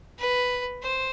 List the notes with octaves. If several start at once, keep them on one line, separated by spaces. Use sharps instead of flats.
B4
C5